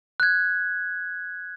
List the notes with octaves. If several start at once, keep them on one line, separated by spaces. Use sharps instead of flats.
F#6 G#6